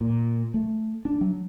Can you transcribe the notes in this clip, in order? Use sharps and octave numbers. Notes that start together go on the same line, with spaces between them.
A#2
A3
D4
F#3